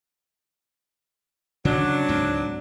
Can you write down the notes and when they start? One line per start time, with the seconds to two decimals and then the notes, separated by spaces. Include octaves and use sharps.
1.65 C#3 F#3 D4
2.08 C#2 G#2 C4